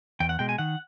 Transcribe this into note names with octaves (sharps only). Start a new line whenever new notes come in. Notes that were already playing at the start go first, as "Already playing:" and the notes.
E2 G5
F#5
B2 G#3 G5
G#5
D#3 F#5